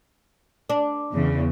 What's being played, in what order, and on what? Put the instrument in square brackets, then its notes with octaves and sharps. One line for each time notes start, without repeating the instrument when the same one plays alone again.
[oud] D4
[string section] E2 C#3